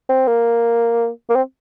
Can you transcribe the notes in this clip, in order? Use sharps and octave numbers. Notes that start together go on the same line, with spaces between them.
C4
A#3
A#3
C4